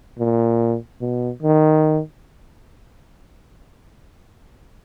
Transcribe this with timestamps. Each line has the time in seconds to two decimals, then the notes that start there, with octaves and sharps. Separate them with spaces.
0.19 A#2
1.01 B2
1.43 D#3